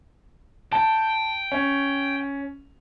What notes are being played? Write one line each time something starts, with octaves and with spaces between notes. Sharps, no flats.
G5 A5
C#4